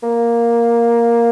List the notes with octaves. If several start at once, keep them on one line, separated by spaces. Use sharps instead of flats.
A#3